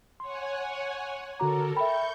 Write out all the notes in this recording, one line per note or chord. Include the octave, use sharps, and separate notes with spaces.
C#5 F#5 G#5 C6
D3 F#4 A4 A#4 A#5 D6
E5 G5 B5 C#6 G6